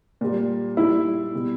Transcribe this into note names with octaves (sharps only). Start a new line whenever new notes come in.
A#2 G3
A#2 G3 E4
B2 G3